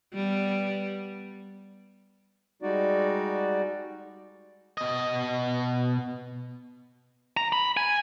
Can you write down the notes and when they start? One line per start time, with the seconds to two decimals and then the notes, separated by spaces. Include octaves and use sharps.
0.14 G3 B3
2.62 G3 G#3 D#4 F#4 D5
4.78 B2 D#5
7.37 A#5
7.52 B5
7.77 G#5